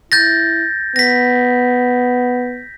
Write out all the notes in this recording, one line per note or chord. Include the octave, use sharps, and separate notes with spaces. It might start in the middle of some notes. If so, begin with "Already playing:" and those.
E4 G6 A6 A#6
B3 A#6 B6